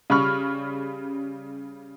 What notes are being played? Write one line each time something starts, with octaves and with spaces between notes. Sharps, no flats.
C#3 G3 B5 C#6 F6